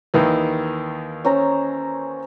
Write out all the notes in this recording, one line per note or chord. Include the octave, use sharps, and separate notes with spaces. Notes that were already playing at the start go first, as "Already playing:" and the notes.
D#2 D#3 E3
C#4 C5 A#5